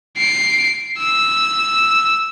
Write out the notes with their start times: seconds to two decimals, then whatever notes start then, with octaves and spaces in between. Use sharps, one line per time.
0.18 C7 D7
0.98 E6